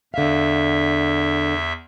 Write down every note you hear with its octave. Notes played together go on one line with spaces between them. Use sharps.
E2 D3 E5 F5